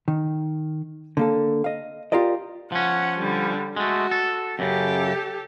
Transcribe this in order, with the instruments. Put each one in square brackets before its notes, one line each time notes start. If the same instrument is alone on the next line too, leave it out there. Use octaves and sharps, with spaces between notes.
[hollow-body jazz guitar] D#3
D3 A#3 A4
D#5 F5
F4 G4 A#4 D5 D#5
[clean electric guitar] F3 C#4 [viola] F#5
[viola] D3 G3
[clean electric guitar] G#3 A3 [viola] F#4
[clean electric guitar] A4
[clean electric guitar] F#2 C#3 [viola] G4 A4